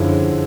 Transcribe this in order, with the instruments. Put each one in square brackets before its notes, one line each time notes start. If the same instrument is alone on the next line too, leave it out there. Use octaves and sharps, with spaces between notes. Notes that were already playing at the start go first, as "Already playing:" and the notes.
Already playing: [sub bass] F#2 [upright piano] D3 F3 G#3 C#4 E4